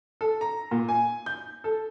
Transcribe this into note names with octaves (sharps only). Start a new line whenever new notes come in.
A4
A#5
A#2
G#5
G6
A4